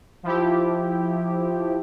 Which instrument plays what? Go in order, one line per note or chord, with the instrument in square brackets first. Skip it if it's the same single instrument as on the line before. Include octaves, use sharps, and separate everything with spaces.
[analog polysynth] F3 E4 G4